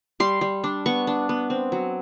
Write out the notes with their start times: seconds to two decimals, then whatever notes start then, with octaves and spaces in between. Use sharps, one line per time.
0.20 G3 C6
0.41 G3
0.64 D4
0.86 B3 C#6
1.07 D4
1.29 B3
1.50 C4
1.72 F#3